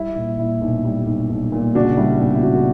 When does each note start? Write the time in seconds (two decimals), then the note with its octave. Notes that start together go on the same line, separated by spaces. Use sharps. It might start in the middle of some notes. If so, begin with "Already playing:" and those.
Already playing: G3 E4
0.15 A#2
0.39 A#2 E4
0.61 B1
0.85 G3
1.06 B1
1.29 B1
1.52 A#2
1.75 C#2 D4 F#4
1.97 G3 E4
2.20 B2 E4 G4
2.35 E4
2.42 C#2 D4 F#4
2.54 F#4